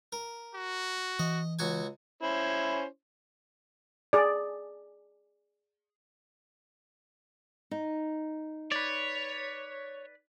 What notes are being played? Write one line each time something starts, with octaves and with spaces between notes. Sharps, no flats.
A#4
F#4
E3 D#5
C#2 F#4 G#5
C#4 E4 C5
G#4 D5
D#4
B4 C#5 D5